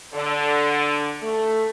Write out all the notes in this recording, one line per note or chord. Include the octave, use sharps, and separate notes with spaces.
D3
A3